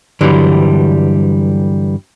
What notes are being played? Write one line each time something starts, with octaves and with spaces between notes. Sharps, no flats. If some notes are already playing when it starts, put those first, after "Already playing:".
G2 D3 E3 F#3 G3